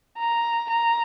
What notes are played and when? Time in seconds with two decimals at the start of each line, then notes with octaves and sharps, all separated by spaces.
0.18 A#5
0.70 A#5